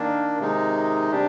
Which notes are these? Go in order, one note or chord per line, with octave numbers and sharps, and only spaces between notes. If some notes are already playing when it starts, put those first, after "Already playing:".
Already playing: D#3 A#3 D4
C3 D#3 G#3 D#4
C3 G3 D4 G4